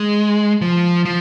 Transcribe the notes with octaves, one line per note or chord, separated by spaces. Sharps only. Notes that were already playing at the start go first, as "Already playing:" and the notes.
Already playing: G#3
F3
F3